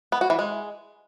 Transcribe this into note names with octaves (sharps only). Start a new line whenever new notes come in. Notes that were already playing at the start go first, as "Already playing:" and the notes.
B3
F#4
E3
G#3